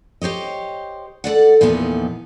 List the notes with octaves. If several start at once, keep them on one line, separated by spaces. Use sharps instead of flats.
G4 C5 C#5 D#5
A4 B4 D5 F#5
E2 A#2 E3 F3 B3 D#4